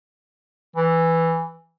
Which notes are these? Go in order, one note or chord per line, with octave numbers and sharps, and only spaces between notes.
E3